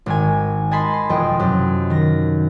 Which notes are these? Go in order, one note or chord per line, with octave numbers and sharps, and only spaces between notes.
G#1 D#3 G#5
D#5 G#5 A5 B5 C6
C6
E1 F2 D#5 G5
F#2 C3
D#3 A#6